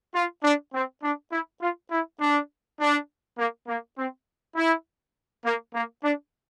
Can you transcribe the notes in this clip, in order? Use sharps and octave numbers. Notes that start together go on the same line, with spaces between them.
F4
D4
C4
D4
E4
F4
E4
D4
D4
A#3
A#3
C4
E4
A#3
A#3
D4